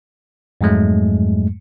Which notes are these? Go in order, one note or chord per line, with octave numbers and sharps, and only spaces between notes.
F2 G#2 F#3 G#3 A3